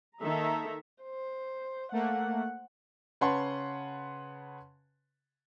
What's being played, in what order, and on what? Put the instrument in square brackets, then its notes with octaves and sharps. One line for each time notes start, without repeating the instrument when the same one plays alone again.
[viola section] D#3 A#3 A4 E5 A#5
[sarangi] C5
[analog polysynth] A3 A#3 [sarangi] F#5
[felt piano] C#3 B4 C#5 F#5 A5 C6